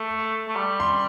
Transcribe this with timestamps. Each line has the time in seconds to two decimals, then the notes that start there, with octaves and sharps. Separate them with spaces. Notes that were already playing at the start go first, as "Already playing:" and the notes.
Already playing: A3
0.48 A3
0.56 G3
0.80 C6